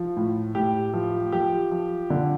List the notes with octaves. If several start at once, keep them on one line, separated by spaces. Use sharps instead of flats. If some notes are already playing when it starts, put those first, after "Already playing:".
Already playing: F3
A2
A2 G4
F3
F3 G4
F3
D3